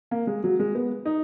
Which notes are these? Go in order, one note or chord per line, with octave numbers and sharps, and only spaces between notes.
A#3
G#3
F#3
G#3
B3
D#4